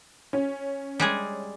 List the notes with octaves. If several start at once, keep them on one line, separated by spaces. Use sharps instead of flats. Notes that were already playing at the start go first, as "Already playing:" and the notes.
C#4
G3 G#3 G#4